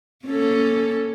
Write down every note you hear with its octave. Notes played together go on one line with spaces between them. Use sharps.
A#3 C#4 A4